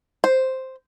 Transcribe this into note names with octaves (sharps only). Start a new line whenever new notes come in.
C5